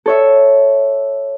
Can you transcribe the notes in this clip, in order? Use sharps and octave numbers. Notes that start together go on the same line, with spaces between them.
A4 C#5 E5